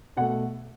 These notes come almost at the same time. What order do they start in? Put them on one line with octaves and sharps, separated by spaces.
B2 F#5 A3